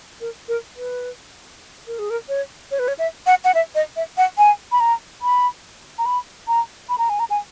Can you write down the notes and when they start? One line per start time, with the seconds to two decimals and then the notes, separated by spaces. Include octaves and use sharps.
0.21 A#4
0.48 A#4
0.76 B4
1.87 A#4
1.99 G#4
2.10 A#4
2.28 C#5
2.71 C#5
2.79 B4
2.88 C#5
2.99 E5
3.26 F#5
3.44 F#5
3.54 E5
3.75 D#5
3.96 E5
4.17 F#5
4.38 G#5
4.72 B5
4.80 A#5
5.22 B5
5.98 A#5
6.06 B5
6.48 A#5
6.89 B5
6.98 A#5
7.09 G#5
7.19 A#5
7.30 G#5